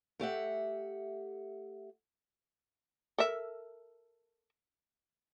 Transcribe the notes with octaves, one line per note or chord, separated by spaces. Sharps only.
A3 G4 E5 F#5
A4 A#4 E5